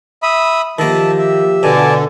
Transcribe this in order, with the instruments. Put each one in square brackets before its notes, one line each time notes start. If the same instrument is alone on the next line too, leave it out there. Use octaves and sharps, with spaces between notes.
[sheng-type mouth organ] E5 B5 D#6
[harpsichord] D#3 A#3 [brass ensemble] F3 G4 [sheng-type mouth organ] E5 A5
[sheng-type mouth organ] E5
[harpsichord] B2 [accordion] D3 [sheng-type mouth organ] D5 G#5 A5